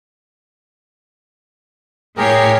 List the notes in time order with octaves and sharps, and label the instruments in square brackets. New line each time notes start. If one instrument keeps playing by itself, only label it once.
[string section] A2 C#5 C7 [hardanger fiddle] G4 [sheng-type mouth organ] G#4 A#4